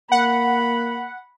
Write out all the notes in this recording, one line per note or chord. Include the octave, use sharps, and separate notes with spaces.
A#3 F#5 B5